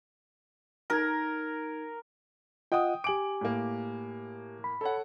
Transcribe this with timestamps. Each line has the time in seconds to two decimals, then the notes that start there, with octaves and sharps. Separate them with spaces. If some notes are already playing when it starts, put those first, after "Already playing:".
0.90 D#4 A#4 G#6
2.72 F4 D#5 F#5 G5 D#6
3.04 G4 G#5 D6 D7 F#7
3.41 A2 A#3
4.64 B5
4.81 A4 C#5 F#5